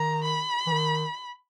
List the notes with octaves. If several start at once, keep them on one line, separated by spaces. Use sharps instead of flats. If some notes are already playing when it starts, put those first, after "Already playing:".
Already playing: D#3 A#5
B5
E3
D#3